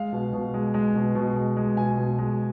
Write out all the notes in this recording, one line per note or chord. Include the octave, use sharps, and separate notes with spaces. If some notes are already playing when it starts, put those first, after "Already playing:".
Already playing: G#3 F5
B2
B2
G#3
G#3
B2
B2
G#3
G#3
B2 G#5
B2
G#3